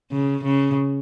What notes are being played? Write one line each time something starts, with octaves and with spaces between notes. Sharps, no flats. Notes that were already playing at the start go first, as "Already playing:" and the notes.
C#3
C#3